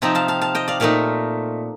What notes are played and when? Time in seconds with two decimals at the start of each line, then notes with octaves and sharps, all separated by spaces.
0.02 C3 F3 C4 D#4 G5 A#5
0.15 F5 A5
0.28 F5 A5
0.41 F5 A5
0.55 D#5 G5
0.68 D5 F5
0.80 A#2 A3 D#4 D5 F5